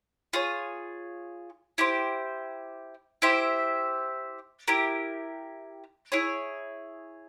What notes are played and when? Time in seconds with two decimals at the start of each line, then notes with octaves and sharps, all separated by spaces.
0.33 F4 G#4 C#5
1.78 E4 G4 C5
3.22 E4 G4 C5 E5
4.68 E4 G4 A#4
6.12 E4 G#4 C#5